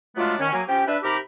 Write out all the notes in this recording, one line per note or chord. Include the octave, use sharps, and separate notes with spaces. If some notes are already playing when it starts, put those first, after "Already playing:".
F#3 G#3 A3 B3 D4 F4
D#3 C#4
F#3 A#3 G#5
F3 C#4 G4 G5
D4 B4 E5
C3 D#4 G4 A#4 B5 D6